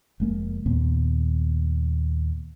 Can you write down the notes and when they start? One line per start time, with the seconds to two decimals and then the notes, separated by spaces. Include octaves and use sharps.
0.20 F1 G#3 A#3
0.66 D#2 A#2 B3